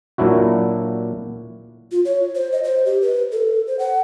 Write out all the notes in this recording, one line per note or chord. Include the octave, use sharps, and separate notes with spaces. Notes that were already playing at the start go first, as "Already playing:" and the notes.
A#2 F#3 D4 E4 F#4
F4
C#5
C5
D#5
C5
G4
B4
A4
C5
F#5